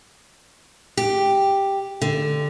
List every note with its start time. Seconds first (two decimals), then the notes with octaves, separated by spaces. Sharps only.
0.97 G4
2.02 D3